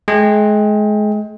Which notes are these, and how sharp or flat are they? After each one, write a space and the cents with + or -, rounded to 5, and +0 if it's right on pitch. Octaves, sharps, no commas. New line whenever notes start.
G#3 +30 G5 +25